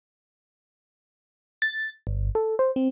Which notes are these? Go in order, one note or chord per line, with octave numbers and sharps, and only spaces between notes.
A6
G1
A4
C5
C4